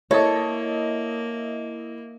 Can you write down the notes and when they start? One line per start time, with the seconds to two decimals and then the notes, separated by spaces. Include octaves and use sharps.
0.11 A#3 E4 A4 C#5 D#5